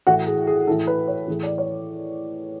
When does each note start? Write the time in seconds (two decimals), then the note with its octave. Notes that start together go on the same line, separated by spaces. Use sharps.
0.07 A2 E3 F#4
0.27 G#4
0.47 G#4
0.67 A2 E3 A4
0.87 B4
1.08 C#5
1.28 A2 E3 G#4
1.43 D5
1.58 C#5